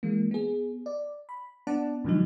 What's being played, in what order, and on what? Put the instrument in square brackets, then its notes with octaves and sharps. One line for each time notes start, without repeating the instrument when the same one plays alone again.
[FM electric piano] E3 G#3 A#3
B3 G#4
D5
B5
B3 D4 D5 F#5 A5
G#2 B2 D3 F3 F#3 D#4